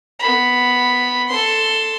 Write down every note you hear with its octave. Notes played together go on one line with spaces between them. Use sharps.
B3 B5
A4 C6